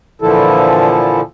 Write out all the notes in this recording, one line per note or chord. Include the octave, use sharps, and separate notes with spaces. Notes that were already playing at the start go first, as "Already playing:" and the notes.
A#2 D3 E3 F3 E4 A4